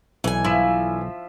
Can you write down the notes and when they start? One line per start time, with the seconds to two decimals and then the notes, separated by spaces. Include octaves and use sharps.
0.24 B1 E3 G#5
0.45 F3 E4 E5